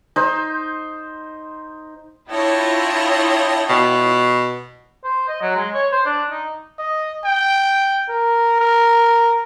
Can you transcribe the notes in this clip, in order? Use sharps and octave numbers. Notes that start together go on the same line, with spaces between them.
D#4 C5
D4 E4 F4 C#5 D#5 G5
B2
C5
D#5
F#3
G#3
C#5
C5
D4
D#4
D#5
G5
A#4
A#4